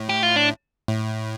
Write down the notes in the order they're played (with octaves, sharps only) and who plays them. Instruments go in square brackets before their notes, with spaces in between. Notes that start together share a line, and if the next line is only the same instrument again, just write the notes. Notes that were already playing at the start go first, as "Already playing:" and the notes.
Already playing: [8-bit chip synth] A2
[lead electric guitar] G4
F4
D4
[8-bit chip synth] A2